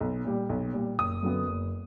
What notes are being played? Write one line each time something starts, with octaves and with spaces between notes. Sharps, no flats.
B1
A#2 G3
B1
A#2 G3
F#1 D#6
F#2 D3 F#3 B3
F#1